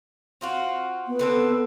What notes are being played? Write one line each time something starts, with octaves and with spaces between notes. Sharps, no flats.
C4 F4 F#4
B3
D3 C4 A4